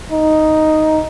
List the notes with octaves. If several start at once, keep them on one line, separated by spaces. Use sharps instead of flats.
D#4